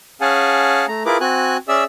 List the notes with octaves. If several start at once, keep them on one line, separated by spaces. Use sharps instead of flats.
C#4 G#4 F5 F#5 G#5 A5
A3 A#5
E4 F4 G#4 A#4 B4 D6
C4 F#4 G#5 F#6
C#4 G#4 D5 E5 E6